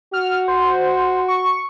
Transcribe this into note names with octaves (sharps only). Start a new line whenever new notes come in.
F#4 F6
C5
C#6